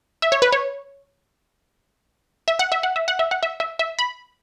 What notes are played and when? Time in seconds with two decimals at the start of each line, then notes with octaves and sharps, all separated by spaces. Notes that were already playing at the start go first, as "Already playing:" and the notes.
0.22 E5
0.32 C#5
0.42 B4
0.52 C#5
2.48 E5
2.59 F#5
2.72 E5
2.83 F#5
2.96 E5
3.08 F#5
3.19 E5
3.31 F#5
3.43 E5
3.60 E5
3.79 E5
3.99 B5